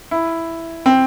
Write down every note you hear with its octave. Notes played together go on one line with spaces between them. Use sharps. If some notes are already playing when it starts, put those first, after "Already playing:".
E4
C4